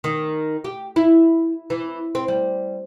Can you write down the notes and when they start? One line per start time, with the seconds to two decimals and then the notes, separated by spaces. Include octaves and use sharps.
0.04 D#3
0.64 G4
0.96 E4
1.70 E3
2.15 C4
2.28 G3